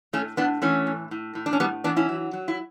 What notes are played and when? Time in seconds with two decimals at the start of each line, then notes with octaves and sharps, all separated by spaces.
0.13 A2 A3 C#4
0.37 A2 B3 D4
0.62 E3 A3 C#4
0.87 A2
1.11 A2
1.35 A2
1.46 D4
1.53 C#4
1.60 A2 G3 B3
1.84 E3 B3 D4
1.96 C#4 E4
2.09 F#3
2.33 F#3
2.48 E4